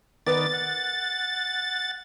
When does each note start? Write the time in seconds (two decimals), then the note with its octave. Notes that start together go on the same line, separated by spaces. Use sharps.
0.27 D#3 B3 A#4 B4 D5 A6
0.53 F#5